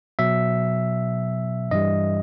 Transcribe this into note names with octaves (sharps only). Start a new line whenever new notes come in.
B2 F#3 E5
G2 E3 G3 D#5